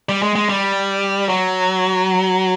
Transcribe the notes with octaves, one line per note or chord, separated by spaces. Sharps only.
G3
G#3
G#3
G3
F#3